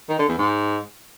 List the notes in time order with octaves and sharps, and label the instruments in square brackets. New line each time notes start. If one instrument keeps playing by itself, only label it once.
[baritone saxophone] D#3
D3
E2
G#2